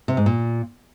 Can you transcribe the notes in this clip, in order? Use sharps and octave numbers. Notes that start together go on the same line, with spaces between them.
C3
G#2
A#2